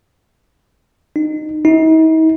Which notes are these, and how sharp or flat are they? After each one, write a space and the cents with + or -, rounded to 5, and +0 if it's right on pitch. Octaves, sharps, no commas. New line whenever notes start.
D#4 -20
D#4 +45